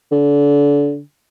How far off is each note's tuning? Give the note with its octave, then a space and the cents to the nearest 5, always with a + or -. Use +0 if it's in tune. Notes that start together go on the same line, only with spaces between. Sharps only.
D3 -30